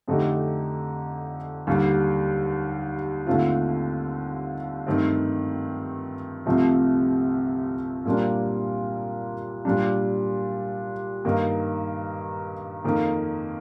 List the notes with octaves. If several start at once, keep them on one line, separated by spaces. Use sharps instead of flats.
F2 D3 A3 D#4 G4
D#2 D3 G3
D#2 D3 A3 C4 F4
G2 D#3 A3 C4
C2 C3 F3 A3 C4
A#2 G3 A#3 D4 F4
A#2 G3 D4
G2 D#3 A#3 D#4
F2 D#3 A#3